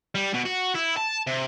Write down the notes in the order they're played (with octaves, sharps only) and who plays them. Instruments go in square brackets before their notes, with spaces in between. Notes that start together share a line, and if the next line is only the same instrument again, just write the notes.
[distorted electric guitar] G3
B2
F#4
E4
A5
C3